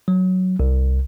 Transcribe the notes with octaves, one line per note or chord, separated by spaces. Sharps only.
F#3
C2